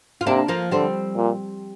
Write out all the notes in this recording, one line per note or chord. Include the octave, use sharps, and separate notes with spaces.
F4
C3 A#3 D4
F3 A#3
D3 G3 C4
A#2